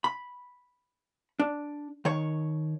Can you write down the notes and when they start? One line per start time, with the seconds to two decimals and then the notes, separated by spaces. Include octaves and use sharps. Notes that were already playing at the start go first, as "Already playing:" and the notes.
0.04 B5
1.40 D4
2.05 D#3 C#5